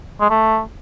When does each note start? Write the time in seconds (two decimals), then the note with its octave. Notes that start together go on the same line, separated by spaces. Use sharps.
0.21 G#3
0.30 A3